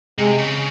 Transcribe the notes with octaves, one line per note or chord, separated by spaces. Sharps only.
C3 G#3
C#3